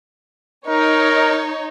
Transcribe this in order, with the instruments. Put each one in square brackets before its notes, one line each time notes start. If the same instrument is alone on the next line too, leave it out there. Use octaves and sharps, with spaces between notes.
[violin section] D#4 C#5 [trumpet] A#4